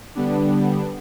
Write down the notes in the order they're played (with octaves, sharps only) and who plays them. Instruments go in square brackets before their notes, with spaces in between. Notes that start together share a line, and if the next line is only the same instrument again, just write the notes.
[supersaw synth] D3 G3 B3 D4